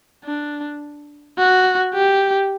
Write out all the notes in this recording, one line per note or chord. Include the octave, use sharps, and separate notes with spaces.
D4
F#4
G4